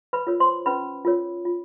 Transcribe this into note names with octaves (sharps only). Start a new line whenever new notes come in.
B4 B5
F4 A#4 C#5
C5 C6
C#4 B4 B5
F4 A#4 C#5
F4